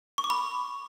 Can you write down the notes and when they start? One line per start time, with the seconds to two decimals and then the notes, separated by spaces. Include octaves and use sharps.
0.18 C#6
0.24 D6
0.30 B5